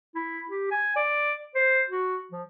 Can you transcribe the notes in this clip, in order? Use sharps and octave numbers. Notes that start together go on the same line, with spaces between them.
E4
G4
G#5
D5
C5
F#4
F3